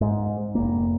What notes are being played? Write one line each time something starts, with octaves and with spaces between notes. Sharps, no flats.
G#2
F1 A#3